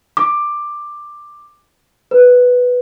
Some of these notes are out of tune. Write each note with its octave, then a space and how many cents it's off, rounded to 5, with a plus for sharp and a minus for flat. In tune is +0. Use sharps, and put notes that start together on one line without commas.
D6 +10
B4 +0